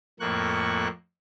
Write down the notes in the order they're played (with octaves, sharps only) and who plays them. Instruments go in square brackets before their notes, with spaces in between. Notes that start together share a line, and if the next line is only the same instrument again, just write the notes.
[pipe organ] F2 A2 A#3 C#6 F#6